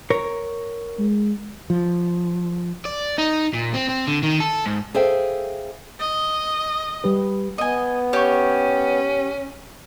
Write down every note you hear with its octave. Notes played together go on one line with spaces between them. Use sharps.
A#4 C#5
G#3
F3
D5
D#4
A#2
C4
C4
D3
D#3
A4
G#2
G#4 A4 C5 E5 F5 G5
D#5
G3 G4 B4
B3 D#5 G#5
C#4 G4 C#5